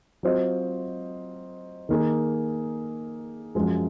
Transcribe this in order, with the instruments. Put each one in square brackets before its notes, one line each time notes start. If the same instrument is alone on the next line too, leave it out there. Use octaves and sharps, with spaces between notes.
[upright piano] F#3 C4 F4 C5 D#5
D#3 A#3 D#4 G#4
F#2 F3 G#3